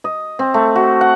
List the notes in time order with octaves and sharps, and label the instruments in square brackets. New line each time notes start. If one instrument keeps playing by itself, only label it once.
[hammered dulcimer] D#5
C4
A3
F#4
F#5